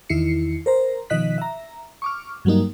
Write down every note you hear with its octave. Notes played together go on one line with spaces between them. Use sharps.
E2 D#3 E4 C7 C#7
A#4 C5 A#5
B2 D#3 F3 D#5 F#6 B6
E5 A#5
C#6 D6 F6
G2 F#3 G3 A#3 D#4